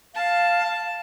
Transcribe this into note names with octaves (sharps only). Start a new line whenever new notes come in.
F5 A5